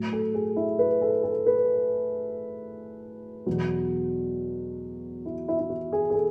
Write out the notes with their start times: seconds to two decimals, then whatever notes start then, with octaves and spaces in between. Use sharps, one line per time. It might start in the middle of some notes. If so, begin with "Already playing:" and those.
Already playing: A2 F#3
0.13 A4
0.34 G#4
0.56 E4
0.79 B4
1.02 A4
1.24 A4
1.47 B4
3.46 E2 B2 F#3
5.26 E4
5.48 E4
5.59 E4
5.70 F#4
5.93 G#4
6.10 G#4
6.14 A4